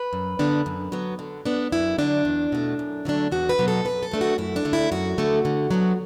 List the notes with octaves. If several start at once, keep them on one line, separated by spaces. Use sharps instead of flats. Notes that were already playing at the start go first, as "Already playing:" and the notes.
Already playing: B4
F#2
D3 B3 D4
F#2
F#3 B3
D3
B3 D4
F#2 E4
D3 F#3 D4
E2
B2 A3
F#2
D3 F#3 A3 D4
E2 F#4
B4
B2 F#3 B3
A4
F#2 B4
A4
D3 A3 D4
F#4
F#2 E4
D4
D3 A3
E4
F#2 F#4
D3 A3 D4
D3
F#3 B3 D4